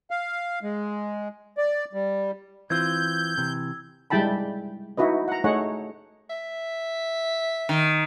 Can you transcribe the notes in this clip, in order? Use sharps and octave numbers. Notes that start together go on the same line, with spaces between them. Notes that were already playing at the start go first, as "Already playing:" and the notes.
F5
G#3
D5
G3
E3 C4 F4 E6 G6 G#6
C3 E3
G3 G#3 E4 G5 A5 B5
D#4 E4 F#4 B4 D#5
F#5 A#5
A3 D#4 G#4 C#5 F#5
E5
D#3